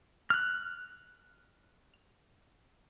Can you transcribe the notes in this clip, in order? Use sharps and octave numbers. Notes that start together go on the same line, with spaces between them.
F6 F#6